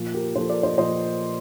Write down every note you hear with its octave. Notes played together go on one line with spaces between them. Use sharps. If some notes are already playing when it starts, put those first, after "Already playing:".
Already playing: A#2 F3
G4 A#4
A#2 F3 A4 C5
A#4 D5
C5 D#5
A#2 F3 C5 D#5